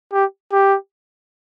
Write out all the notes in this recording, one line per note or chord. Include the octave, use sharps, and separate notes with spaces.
G4
G4